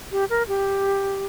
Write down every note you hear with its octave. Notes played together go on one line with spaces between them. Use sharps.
G4
A#4
G4